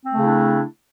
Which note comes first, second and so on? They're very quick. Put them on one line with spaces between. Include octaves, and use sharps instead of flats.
C4 A3 C#3 E4 D4